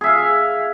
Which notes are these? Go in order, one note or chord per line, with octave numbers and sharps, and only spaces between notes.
G#4 E5 F5